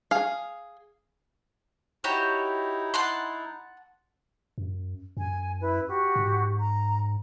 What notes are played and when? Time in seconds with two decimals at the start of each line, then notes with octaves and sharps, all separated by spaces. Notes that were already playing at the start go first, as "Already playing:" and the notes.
0.11 G#4 F5
2.04 D#4 E4 F#4 G4 C#5
2.94 F#5 A5 C6
4.58 F#2
5.17 F#2 G#5
5.61 E4 B4
5.87 F#4 G4
6.16 G#2
6.60 A#5